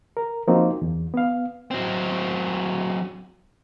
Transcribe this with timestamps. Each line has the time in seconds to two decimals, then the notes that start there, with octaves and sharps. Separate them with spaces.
0.17 A#4
0.48 F3 A#3 C4 D#4 F#4
0.82 E2
1.14 B3 F5
1.71 F#3 C4